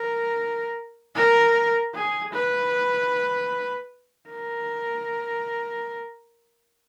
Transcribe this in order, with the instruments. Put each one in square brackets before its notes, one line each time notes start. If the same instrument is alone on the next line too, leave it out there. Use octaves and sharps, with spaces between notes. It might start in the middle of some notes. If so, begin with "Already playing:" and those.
Already playing: [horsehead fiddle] A#4
A#4
G#4
B4
A#4